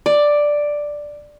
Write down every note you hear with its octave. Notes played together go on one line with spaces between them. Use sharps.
D5